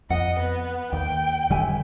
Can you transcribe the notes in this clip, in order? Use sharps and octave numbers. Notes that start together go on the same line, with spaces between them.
F2 D#5 F#5
B3
D#2 G5
F1 D3 G3 E5 G#5